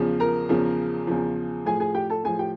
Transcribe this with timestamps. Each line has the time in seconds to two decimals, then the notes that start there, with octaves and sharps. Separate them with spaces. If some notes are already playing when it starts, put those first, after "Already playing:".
Already playing: E2 C#3 F3
0.20 A#4 A#5
0.49 E2 C#3 F3
1.07 E2 C#3 F3
1.65 A2 F3 G#4 G#5
1.80 G#4 G#5
1.95 G4 G5
2.10 A4 A5
2.24 A2 F3 G#4 G#5
2.39 G4 G5